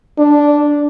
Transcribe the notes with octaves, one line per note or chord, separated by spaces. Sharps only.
D4